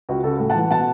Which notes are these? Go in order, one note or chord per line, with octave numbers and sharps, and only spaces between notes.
C#2 F#4
C#3 F#4 A4
A2
F#5 A5
E3
B2 F#5 A5